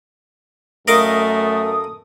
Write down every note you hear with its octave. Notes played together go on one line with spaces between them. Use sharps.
F#2 A3 A4 A#4 D#5 F5 D#6